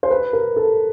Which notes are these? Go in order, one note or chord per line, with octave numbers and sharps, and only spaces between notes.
C5
B4
A#4
A4